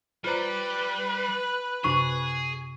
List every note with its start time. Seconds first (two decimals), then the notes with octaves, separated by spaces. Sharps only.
0.24 G3 F4 B4 C5 D5 A#5
1.84 F#2 C3 D4 G#4 C#6